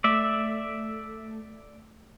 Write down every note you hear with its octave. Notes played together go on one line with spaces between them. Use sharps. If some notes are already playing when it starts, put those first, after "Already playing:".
A3 D5 E5